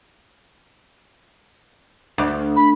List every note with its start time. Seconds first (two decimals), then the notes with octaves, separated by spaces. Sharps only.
2.18 D2
2.56 B5